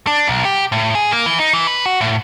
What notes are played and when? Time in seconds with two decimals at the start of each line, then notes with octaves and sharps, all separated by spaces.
0.07 D4
0.28 B1
0.45 G4
0.72 A2
0.95 G#4
1.12 A#3
1.26 E3
1.39 D#4
1.53 E3
1.67 B4
1.86 F#4
2.01 A2